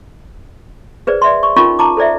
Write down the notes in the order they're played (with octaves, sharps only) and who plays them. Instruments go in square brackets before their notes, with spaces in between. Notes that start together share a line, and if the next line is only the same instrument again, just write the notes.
[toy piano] G#4 B4 C5 D5
D5 E5 C6
C#6
C#4 D#4 F4 A#4 B5 C#6
A5 A#5 D6
A4 C5 D5 E5